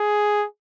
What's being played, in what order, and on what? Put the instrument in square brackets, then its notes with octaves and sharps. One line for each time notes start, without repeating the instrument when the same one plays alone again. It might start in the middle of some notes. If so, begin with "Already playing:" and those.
Already playing: [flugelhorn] G#4